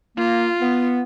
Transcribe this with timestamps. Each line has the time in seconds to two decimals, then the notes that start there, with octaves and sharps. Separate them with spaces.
0.17 A#3 F4
0.61 B3